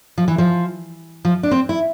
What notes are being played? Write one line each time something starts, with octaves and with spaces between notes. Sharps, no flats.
F3
E3
F3
F3
D4
C4
E4